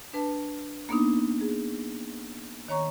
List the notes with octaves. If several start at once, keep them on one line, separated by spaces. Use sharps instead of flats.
D4 B4 A5
A#3 B3 D4 D#4
G#4
D#3 C#5 A#5 C#6